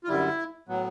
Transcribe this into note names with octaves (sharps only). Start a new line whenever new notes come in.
F4
F#2 D3 G3 E4
A2 F#3 B3